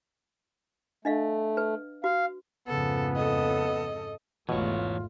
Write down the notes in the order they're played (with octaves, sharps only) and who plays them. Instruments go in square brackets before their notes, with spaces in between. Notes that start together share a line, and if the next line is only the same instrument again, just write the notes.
[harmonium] A3 [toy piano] D4 D#5 F5
[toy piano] B4
[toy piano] F#4 [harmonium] F5
[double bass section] F2 G#2 C#3 [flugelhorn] B3 [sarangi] A4
[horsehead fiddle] A4 [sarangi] D#5
[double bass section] G#1 E2 A3 [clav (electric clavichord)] B2 [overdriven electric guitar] E3 C#5 [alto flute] F4